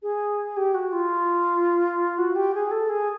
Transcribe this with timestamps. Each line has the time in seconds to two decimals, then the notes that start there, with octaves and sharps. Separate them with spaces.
0.03 G#4
0.57 G4
0.74 F#4
0.92 F4
2.18 F#4
2.36 G4
2.54 G#4
2.71 A4
2.89 G#4